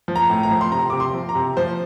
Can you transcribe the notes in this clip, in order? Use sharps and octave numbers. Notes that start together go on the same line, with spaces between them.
F3
A#5
A2
A#5
F3
C6
C3 A#5
C3 D6
C6
F3
A#5
C3
F3 C5